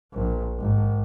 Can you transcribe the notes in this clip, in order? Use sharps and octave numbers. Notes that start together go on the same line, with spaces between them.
A#1
G#1